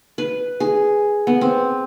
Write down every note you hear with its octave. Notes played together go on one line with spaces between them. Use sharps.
B4
G#4
B3
C4